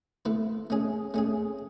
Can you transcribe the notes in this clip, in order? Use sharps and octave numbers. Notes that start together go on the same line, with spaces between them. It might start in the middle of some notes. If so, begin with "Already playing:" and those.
A3 E4 B4
A3 C#4 G#4
A3 C#4 G#4